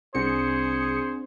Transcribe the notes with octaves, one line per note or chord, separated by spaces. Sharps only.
C2 C4 D4 G#4 C5 C#7